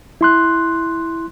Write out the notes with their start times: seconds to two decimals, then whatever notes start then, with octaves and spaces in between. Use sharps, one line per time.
0.21 E4 C6 F#6